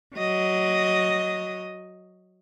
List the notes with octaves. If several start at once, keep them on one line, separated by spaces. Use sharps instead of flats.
F#3 D#5